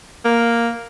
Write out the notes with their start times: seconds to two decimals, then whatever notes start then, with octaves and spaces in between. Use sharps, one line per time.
0.25 A#3